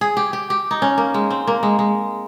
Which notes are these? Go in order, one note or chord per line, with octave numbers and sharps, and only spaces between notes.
G#4
G4
G4
G4
D#4
C#4
A#3
G#3
C4
A#3
G#3
G#3